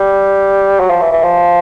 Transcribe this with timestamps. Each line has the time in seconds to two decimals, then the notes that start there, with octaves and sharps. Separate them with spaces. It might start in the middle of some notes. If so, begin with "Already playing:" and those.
Already playing: G3
0.80 F#3
0.90 F3
1.01 E3
1.12 E3
1.23 F3